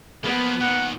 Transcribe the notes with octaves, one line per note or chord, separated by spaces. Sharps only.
F3 A#3 B3
A#2 D#3 F#5